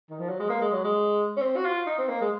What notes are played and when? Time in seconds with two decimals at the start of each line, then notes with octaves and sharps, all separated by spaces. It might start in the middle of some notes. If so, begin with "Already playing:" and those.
0.10 D#3
0.19 F3
0.29 F#3
0.40 G#3
0.50 A#3
0.61 G#3
0.73 F#3
0.84 G#3
1.37 C#4
1.41 C4
1.56 F#4
1.65 F4
1.87 D#4
1.98 C4
2.09 A#3
2.21 G#3